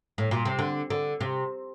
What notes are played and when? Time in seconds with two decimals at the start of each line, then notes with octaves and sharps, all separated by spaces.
0.18 A2
0.31 A#2
0.45 C3
0.59 D3
0.90 D3
1.21 C3